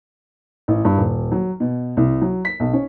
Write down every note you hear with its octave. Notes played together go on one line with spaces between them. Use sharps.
A1
G2
D#1
F#3
B2
C2
F#3
B6
B1
C#4